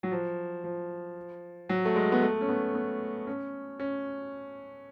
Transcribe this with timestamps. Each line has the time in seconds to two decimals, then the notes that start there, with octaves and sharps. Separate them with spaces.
0.03 F#3
0.11 F3
0.64 F3
1.69 F#3
1.85 A3
1.96 G#3
2.12 B3
2.22 A3
2.41 C#4
2.49 B3
2.74 B3
3.27 C#4
3.80 C#4